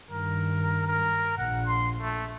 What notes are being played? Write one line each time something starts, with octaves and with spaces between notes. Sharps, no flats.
G2 D#3 A#4
A#4
A#1 F#5
C6
A3